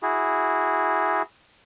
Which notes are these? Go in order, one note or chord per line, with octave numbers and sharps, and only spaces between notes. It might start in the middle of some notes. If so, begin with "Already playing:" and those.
E4 F#4 G#4